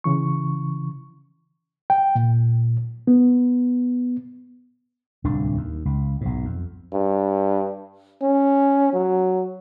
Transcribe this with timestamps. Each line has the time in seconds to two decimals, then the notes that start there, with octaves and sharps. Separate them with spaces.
0.04 C#3 E3 C#6
1.90 G5
2.15 A#2
3.07 B3
5.24 D1 C2 D4
5.57 D#2
5.85 C#2
6.21 B1 G#2
6.45 F2
6.93 G2
8.22 C#4
8.93 F#3